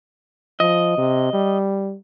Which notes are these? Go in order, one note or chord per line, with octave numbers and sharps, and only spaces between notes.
F3 D#5
C3
G3